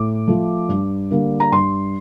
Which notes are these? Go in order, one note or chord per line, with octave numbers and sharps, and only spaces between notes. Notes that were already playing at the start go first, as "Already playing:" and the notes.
Already playing: A2 D6
F3 A3
G2
D3 G3 A#3
A#5
G2 C6